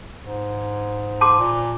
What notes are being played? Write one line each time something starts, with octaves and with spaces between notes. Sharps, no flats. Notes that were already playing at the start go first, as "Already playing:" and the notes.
G#2
A5 C6 D6
A#2